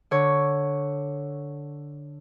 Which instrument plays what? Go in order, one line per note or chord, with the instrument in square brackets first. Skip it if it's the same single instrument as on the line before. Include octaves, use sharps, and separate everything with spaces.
[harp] D3 C#5